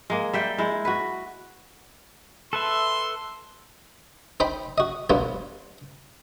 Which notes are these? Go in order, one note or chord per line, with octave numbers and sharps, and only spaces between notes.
G#3 A#3
G3 E5 G5
G#3 E4
F#4 B4
A4 B4 E5 C6
D#4 C5 G5 B5
F#4 D#5
G2 B2 F#3 A#3 B3 F4